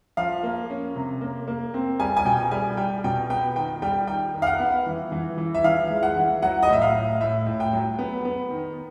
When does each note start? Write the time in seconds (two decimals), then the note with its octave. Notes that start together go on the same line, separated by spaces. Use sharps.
0.17 F3 F5
0.43 A#3
0.70 C#4
0.96 C3
1.21 A#3
1.48 A#3
1.74 C4
2.00 G3 G#5
2.17 G#5
2.25 B2 G5
2.51 G3 G#5
2.77 G3 G5
3.04 B2 G5
3.30 B3 G5
3.56 D#3 G5
3.82 G3 G5
4.08 D#3 G5
4.34 D#3
4.42 F5
4.47 F#5
4.60 B3
4.86 E3
5.12 E3
5.38 E3
5.54 E5
5.64 E3 F5
5.90 G#3
6.03 F#5
6.16 E3
6.42 F#3 F#5
6.62 D#5
6.69 A2 E5
6.82 F5
6.94 A2
7.21 A2 E5
7.46 A2
7.60 G5
7.73 F#3
7.99 B3
8.25 B3
8.50 D#3